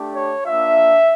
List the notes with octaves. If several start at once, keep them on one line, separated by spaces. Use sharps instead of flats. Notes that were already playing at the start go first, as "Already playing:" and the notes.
Already playing: A3 D4 G4
C#5
A#3 D4 F4 E5